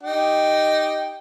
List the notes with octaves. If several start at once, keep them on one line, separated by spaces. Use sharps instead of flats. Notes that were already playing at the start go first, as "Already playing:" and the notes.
D#4 G4 G5